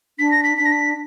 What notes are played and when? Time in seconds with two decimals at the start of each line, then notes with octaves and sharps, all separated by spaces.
0.19 D4 B6
0.31 A#6
0.43 B6
0.58 D4 B6
0.66 A#6
0.72 B6